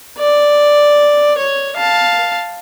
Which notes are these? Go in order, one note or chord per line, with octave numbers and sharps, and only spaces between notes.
D5
C#5
F5 A5